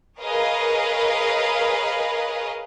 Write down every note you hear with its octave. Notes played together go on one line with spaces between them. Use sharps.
G#4 A#4 B4 C#5 D#5 F5